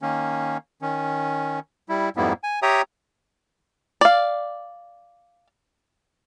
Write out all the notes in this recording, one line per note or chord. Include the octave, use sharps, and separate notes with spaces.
D#3 A#3 C#4
D#3 C#4
G3 E4
F2 G#2 G3 A#3 B3 E4
G#5
G4 C#5 E5 G5 A#5 D#6
D5 F5